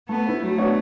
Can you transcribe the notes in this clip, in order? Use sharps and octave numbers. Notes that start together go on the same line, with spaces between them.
A3 B3
E4 B4
F#3 A3
B3 D4 F#4 C#5